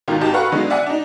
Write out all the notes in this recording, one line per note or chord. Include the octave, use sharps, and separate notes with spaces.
G#1 B2 D#3 F4
G#1 D#4 G4 A5
F#4 A4 B4 F5 F#5 C#6
D3 F#3 G#3 B3 D#4
D5 E5 F#5 G#5
D4 D#4